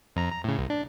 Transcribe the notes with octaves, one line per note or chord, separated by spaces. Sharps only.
F2 A#5
A#5
A2 C#3
C2
D4